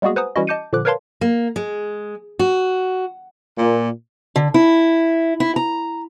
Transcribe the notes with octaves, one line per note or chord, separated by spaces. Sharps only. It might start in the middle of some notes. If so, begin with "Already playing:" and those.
G3 G#3 A#3 B3 F#4 G#4
B4 C5 F#5 G#5 A#5 D#6
E3 G3 C#4 E4 F#4 D#5
D#5 A5 D6 G6 C#7 D#7
A#2 D3 F3 D6 F#6
A#4 B4 C#5 F5 A5 C6
A#3
G#3
F#4
A#2
D3
E4
E4
A#5